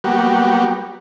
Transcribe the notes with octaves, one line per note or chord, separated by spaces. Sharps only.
F#3 G3 A#3 B3 F#4 G4